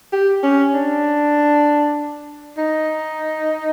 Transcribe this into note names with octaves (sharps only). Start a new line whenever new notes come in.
G4
C#4
D4
D#4